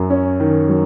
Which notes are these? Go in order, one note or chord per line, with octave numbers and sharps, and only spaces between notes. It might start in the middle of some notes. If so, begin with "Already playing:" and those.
Already playing: F#2 F#3
C#4
D#3
F#3